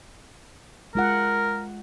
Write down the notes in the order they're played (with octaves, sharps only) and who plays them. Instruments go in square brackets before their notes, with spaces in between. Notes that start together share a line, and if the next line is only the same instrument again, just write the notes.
[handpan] G#3 F4 F#5 [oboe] A#4